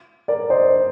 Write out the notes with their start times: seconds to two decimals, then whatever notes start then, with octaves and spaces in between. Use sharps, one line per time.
0.28 A#4 D5
0.50 C5 D#5